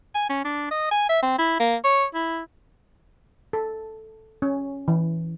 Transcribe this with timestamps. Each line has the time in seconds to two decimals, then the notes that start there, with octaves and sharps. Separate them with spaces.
0.15 G#5
0.29 C#4
0.44 D4
0.71 D#5
0.91 G#5
1.09 E5
1.22 C4
1.39 E4
1.60 A#3
1.84 C#5
2.15 E4
3.53 A4
4.42 C#4
4.88 E3